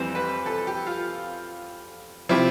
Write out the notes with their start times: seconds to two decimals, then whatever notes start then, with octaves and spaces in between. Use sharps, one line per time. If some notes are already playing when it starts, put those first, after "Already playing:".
Already playing: F2 E3 G3 C5
0.15 B4
0.46 A4
0.67 G4
0.86 F4
2.29 C3 F3 E4